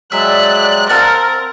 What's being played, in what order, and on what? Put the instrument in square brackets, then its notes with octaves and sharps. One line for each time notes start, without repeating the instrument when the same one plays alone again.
[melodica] F#3 G#3 [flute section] G4 D5 [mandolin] E5 [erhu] F#6
[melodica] C4 [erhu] A#4 [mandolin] F5 F#5 A5